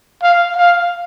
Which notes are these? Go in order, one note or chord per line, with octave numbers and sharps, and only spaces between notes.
F5
F5